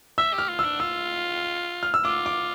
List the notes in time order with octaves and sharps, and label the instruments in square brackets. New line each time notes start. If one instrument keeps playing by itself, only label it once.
[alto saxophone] E5 [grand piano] E6
[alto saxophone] G4 [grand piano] F6
[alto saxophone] F4
[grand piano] E6
[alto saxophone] D4
[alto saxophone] F4 [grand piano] E6
[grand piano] F6
E6
[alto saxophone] F4 [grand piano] D6
[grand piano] D6